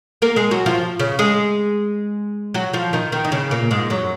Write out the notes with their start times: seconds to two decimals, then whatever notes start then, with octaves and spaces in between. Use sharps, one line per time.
0.22 A#3 A#4
0.36 G#3 G#4
0.51 F#3 F#4
0.66 F3 F4
0.99 C#3 C#4
1.19 G#3 G#4
2.54 F#3 F#4
2.73 F3 F4
2.93 D#3 D#4
3.12 D#3 D#4
3.25 D#4
3.32 C#3 C#4
3.51 A#2 A#3
3.71 G#2 G#3
3.90 F#2 F#3